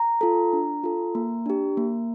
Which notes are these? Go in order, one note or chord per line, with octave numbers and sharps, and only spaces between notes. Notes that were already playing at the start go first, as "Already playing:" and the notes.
Already playing: A#5
F4 A4
D4
F4 A4
A#3
D4 G4
A#3